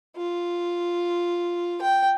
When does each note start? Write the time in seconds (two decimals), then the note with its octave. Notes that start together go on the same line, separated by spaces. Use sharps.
0.17 F4
1.82 G5